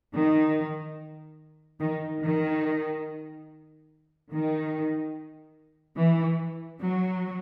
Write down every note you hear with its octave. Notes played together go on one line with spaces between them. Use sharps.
D#3
D#3
D#3
D#3
E3
F#3